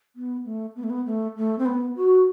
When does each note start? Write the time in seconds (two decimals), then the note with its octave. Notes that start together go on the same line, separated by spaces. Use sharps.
0.16 B3
0.45 A3
0.76 B3
0.83 A3
0.90 B3
1.06 A3
1.37 A3
1.58 C4
1.66 B3
1.96 F#4